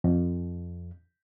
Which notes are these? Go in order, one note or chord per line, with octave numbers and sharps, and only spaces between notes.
F2